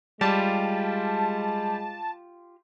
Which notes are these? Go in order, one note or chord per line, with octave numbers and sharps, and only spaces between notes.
G3 G#3 F4 G4 A5